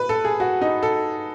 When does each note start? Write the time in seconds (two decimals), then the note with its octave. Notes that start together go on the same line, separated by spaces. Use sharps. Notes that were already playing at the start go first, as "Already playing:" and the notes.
Already playing: B4
0.09 A4
0.25 G#4
0.40 F#4
0.61 D#4
0.83 A4